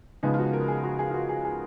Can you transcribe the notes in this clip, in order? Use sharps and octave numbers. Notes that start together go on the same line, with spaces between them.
C#2 C#3 F3 G#3 B3 D#4
F4
F#4
A#4
G#4
F#4
G#4
F4
F#4
G#4
G#4